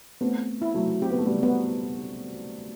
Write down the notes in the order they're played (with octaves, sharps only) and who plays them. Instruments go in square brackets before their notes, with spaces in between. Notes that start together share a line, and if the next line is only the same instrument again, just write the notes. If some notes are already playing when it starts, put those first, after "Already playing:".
[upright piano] A3 C4 [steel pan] B3
[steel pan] E4
[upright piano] F#3 A3
[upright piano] C4 [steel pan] G4
[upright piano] B3
A3
G3 B3
[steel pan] B3